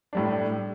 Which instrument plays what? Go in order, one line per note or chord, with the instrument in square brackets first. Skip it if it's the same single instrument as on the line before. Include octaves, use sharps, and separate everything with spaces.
[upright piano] A2 G3 D4